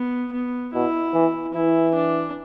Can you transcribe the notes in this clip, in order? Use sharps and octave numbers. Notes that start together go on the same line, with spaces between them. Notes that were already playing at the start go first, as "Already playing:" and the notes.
Already playing: B3
B3
B2 E4
E3
E3 E4
D4